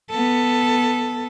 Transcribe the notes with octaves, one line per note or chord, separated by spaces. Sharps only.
B3 A4